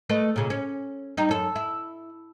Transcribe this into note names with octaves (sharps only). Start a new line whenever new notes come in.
A3 B4 D#5
A#2 C#3
C#4
G3 D#4
F#2 A4
E4